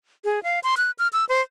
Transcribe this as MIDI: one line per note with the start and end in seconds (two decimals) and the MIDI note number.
0.25 0.43 68
0.43 0.60 77
0.64 0.75 84
0.77 0.91 90
0.99 1.08 89
1.13 1.25 88
1.29 1.41 72